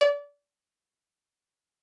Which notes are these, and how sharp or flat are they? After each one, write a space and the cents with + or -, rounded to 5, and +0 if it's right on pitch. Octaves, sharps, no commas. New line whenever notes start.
D5 -30